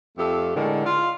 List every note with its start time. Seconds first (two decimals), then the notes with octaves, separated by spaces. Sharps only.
0.18 F2 A3 G4 A4
0.55 A2 D3 G#3 A#4
0.85 F4